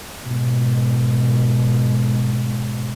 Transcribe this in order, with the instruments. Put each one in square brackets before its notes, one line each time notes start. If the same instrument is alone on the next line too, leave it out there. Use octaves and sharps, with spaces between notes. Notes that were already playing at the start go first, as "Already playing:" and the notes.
[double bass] G#2 B2